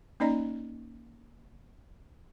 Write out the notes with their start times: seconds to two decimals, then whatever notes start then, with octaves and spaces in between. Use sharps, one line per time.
0.20 A#3 C#4 D#4 D5 D#5 A#5